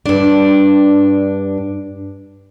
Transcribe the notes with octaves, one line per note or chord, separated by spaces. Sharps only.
G2 D4